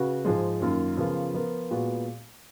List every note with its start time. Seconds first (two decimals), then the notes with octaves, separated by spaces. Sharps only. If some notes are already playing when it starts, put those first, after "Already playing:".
Already playing: C#3 F#4 B4
0.25 G#2 F3 G#3
0.61 F#2 D#3 A#3 F4
0.97 C#3 F3 B3 F4 A#4
1.34 F3 B3 F4 A#4
1.71 A#2 G#3 B3 F#4